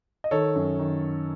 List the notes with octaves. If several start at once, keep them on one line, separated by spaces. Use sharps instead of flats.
D#5
D#3 A4 C#5
F#2
D#3